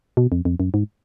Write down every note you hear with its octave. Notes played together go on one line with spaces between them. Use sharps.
B2
F2
F2
F#2
G#2